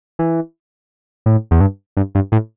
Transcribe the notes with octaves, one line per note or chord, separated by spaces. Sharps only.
E3
A2
E2
G2
G2
G2
A2